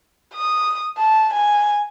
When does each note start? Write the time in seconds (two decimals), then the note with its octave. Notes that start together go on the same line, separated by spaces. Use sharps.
0.34 D#6
0.97 A5
1.34 G#5